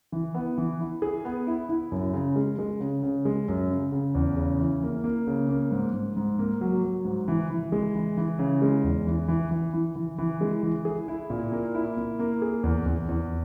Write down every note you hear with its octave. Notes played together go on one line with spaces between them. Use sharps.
E3
B3
E3
E4
G#4
B3
E4
E4
F#2
C#3
G#3
G#3
C#3
C#3
G#3
F#2
C#3
C#3
E2
C#3
E3
A#3
A#3
C#3
A#3
G#2
G#2
G#2
A#3
F#3
F#3
G#2
E3
E3
G#3
E3
E3
C#3
G#3
E2
E3
E3
E3
E3
E3
E3
G#3
E3
G#4
E4
A#2
A#3
E4
A#3
A#3
G#4
E2
E2
E2